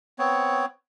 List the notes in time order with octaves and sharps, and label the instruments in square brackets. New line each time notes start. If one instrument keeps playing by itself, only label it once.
[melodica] B3 C4 C#5